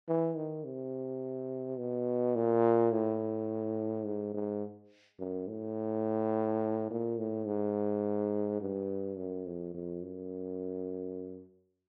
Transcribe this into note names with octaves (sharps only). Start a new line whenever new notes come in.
E3
D#3
C3
B2
A#2
A2
G#2
G#2
F#2
A2
A#2
A2
G#2
G2
F#2
F2
F2
F#2